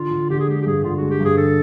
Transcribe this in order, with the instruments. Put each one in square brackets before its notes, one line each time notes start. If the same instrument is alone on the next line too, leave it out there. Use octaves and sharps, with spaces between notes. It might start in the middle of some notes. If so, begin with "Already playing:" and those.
Already playing: [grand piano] D3 [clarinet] F4
[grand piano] D3
[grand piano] D3 [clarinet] G4
[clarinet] G#4
[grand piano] G#3 [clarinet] G4
[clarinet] G4
[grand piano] G2 [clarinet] G#4
[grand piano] D3 [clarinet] F4
[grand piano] G#3 [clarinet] F#4
[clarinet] G4
[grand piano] G2 [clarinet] G#4
[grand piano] D3 [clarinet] A4